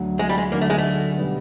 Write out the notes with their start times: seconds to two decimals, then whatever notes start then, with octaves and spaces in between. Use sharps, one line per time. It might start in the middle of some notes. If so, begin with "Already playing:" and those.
Already playing: D2 D3 F#3
0.19 G#3
0.29 G3
0.38 G#3
0.52 D2 D3 F#3 A#3
0.61 A3
0.70 G#3
0.78 A3
1.17 B2 G3 B3